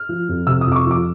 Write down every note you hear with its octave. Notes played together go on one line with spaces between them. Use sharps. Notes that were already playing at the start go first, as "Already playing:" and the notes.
Already playing: F6
F3
F2
C3 E6
D#6
F2
D6
C#6
F3 D6